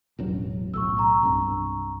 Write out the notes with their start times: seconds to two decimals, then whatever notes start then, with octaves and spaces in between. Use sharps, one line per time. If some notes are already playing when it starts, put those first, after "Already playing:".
0.19 E1 A1 F#3
0.74 B1 A2 C#6 E6
0.97 A#5 C#6
1.23 C2 G2